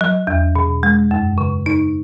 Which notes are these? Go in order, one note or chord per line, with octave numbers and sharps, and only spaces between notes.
F#3
E2
B2
G#3
F#2
C#3
D#4